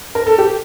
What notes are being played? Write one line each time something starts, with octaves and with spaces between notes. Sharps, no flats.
A#4
A4
G4